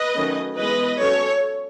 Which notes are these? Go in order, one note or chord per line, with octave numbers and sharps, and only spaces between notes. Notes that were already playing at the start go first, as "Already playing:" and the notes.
Already playing: B4 D#5
D#3 F#3 A3 C#4
E3 G#3 B3 B4 D#5
F#3 C#4 A4 C#5